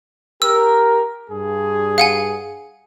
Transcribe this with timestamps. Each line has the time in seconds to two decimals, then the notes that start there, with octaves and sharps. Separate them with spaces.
0.42 G4 A#4 E6
1.30 G2 G#4
1.98 F5 F#5 G#5